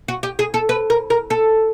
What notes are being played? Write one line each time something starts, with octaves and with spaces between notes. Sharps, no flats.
F#4
G4
G#4
A4
B4
A#4
A#4
A4